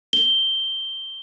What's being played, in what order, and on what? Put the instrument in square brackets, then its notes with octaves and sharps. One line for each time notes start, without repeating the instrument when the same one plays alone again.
[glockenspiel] G7